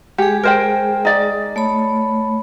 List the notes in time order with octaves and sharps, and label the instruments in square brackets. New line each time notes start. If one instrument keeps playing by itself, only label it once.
[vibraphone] G#3 G#4 [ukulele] G4
[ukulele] A#4 C5 G5
D#4 D5
[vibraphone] A3 C#5 B5